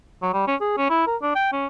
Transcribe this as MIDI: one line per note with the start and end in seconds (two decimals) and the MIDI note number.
0.22 0.29 54
0.34 0.46 55
0.47 0.55 61
0.61 0.75 68
0.77 0.88 61
0.90 1.07 64
1.07 1.16 70
1.22 1.31 62
1.35 1.52 79
1.53 1.67 61